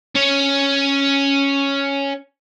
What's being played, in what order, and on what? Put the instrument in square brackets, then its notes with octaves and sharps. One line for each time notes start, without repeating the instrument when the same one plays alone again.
[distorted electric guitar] C#4 C#5